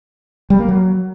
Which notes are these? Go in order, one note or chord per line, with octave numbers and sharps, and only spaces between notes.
G3
A#3
F#3